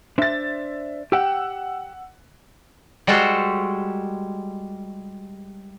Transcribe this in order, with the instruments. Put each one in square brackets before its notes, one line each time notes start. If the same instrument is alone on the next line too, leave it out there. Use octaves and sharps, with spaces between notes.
[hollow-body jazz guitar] D4 C5 [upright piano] E5 A6
[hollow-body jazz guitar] G4 G5 [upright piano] F#5 E6
[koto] G3 G#3 F#4 G4 A4 C5